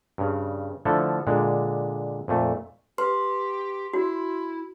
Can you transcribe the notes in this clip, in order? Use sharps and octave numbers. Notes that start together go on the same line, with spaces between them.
G2 C#3
D3 F3 A3 E4 A4
A#2 D3 G#3
F2 A#2 A3
G4 B4 C6
E4 F#4